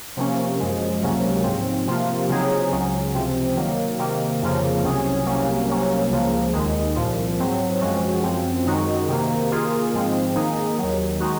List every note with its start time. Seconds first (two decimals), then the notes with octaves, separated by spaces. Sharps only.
0.17 C3 F3 A#3 C#4
0.60 F#2 F3 G#3
1.02 C#2 C3 F#3 A#3 C#4
1.44 G#2 F3 C4
1.87 C3 F3 A#3 F4
2.29 C#3 F#3 C4 D#4 G#4
2.72 C#2 C#3 F#3 C#4
3.14 C#2 C3 F3 C4
3.57 D#3 F#3 A#3
3.99 C3 D#3 A#3
4.42 F2 C#3 F3 A#3
4.84 C2 C3 F#3 C#4 G#4
5.26 C2 C3 F#3 A#3 C#4
5.69 C2 C3 F#3 A#3 C#4
6.11 C#2 C#3 F3 A#3
6.53 D#2 D#3 G#3
6.96 C2 A#2 F3
7.39 G#2 F#3 C4
7.81 F#2 F3 G#3 C#4 F#4
8.23 F#2 F3 C4
8.66 F#2 D#3 G#3 D#4 F#4
9.08 C3 D#3 A#3
9.51 D#3 A#3 F4 G#4
9.93 G#2 F3 G#3 C4
10.35 D#3 A#3 D#4 G#4
10.78 D#2 D#3 F#3
11.20 D#3 G#3 D#4 F#4